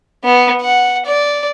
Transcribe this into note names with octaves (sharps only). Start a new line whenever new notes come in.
B3
F#5
D5